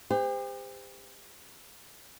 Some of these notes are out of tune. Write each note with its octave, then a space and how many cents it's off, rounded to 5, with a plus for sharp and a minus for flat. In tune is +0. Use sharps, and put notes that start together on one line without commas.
G4 +40 C5 -30